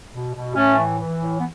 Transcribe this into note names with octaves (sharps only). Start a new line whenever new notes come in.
B2
B2
A2 A3 C#4
E3
E3
A2
B3